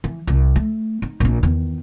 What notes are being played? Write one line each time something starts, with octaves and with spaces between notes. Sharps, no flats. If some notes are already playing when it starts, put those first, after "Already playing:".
E3
C2
A3
D#4
A#1 D4
E2 D#3